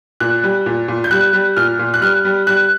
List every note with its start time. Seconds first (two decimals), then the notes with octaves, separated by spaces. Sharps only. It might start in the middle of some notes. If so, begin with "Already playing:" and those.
0.20 A#2 F#6
0.44 G3
0.66 A#2
0.88 A#2
1.04 G6
1.11 G3 F#6
1.33 G3
1.57 A#2 F6
1.79 A#2
1.94 F#6
2.01 G3 F6
2.25 G3
2.47 G3 F#6